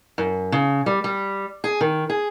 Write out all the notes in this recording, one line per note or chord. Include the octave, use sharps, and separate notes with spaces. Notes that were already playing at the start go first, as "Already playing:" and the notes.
F#2
C#3
G3
G3
G#4
D#3
G#4